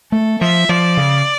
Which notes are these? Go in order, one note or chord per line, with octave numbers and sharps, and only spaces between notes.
A3 A4
F3 E5
F3 D5
C#3